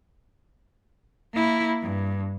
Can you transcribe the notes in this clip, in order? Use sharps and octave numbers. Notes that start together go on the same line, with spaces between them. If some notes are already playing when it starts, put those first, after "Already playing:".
A#3 E4
G2